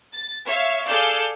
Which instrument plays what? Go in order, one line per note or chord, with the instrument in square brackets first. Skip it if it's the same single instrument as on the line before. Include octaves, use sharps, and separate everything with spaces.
[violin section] A6
C#5 E5 F5
G#4 A4 D5 F5 E6 G6